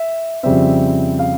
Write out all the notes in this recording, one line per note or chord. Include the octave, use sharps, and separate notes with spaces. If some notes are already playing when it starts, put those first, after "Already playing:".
Already playing: E5
F2 C#3 G3 C4 E5
F5